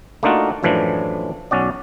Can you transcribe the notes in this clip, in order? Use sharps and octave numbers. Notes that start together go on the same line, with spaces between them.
A3 A#3 D4 D#4 F4 F#4
F#2 A2 E3 F3 D4
B1 C#4 F#4 D5